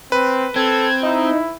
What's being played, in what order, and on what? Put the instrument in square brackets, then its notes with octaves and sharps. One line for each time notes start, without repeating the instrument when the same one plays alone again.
[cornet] C4 [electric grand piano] B4
[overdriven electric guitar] C4 [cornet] A4 [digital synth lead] G#6
[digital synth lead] D#4 [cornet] E4